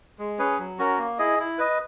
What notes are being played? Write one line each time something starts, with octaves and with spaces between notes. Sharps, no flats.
G#3
C#4 G#4 B4
F#3
C#4 F#4 A#4
A#3
E4 G#4 D#5
E4
B4 D#5